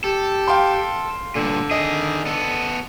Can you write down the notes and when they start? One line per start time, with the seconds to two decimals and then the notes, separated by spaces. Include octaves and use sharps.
0.04 G4 A4
0.47 F5 G5 C6
1.36 G2 A#2 D3
1.71 D#3 G#4 D#5
2.26 B3 A4